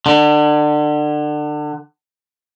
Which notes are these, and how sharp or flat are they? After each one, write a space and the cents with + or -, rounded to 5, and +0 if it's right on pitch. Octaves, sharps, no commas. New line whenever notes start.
D3 +30